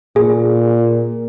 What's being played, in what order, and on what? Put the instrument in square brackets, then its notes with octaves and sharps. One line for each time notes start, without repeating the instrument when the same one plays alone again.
[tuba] A#2 [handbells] G#4